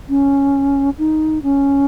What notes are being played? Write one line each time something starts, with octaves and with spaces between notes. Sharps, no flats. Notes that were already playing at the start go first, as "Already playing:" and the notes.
C#4
D#4
C#4